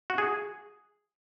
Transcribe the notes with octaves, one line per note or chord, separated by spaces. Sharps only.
F#4
G#4